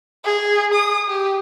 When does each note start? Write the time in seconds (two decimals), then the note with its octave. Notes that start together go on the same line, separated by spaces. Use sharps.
0.24 G#4
0.73 D#6
1.08 G4